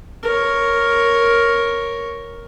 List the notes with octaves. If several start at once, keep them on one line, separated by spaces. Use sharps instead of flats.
A#4 C#5